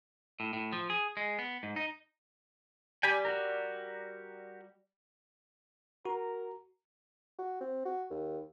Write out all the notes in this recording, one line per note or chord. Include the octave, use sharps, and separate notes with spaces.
A2
A2
F3
G#4
G#3
B3
G#2
D#4
G3 D5 G5 G#5 B5
F#4 G4 A#4
F#4 A#4
F#4
C4
F#4
D#2